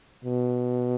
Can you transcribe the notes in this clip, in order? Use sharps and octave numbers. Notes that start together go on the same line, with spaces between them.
B2